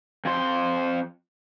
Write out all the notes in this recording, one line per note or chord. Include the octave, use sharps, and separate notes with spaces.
F2 C5